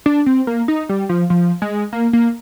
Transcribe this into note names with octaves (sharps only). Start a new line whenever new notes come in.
D4
C4
A#3
D#4
G3
F3
F3
G#3
A#3
A#3